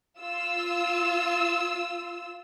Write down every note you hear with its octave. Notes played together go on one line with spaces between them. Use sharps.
F4 E6